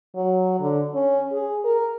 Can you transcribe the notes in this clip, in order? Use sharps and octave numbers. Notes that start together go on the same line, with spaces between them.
F#3
D3
C#4
G#4
A#4